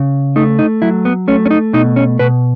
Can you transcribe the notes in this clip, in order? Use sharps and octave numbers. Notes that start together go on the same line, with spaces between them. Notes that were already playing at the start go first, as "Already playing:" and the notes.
Already playing: C#3
A3 D#4
D#4
F#3 E4
B3
A3 C#4
C#4
D#4
B2 D#4
C#4
B2 B4